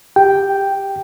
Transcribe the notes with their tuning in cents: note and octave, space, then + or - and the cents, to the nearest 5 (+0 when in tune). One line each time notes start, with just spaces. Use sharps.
G4 +10 G5 +0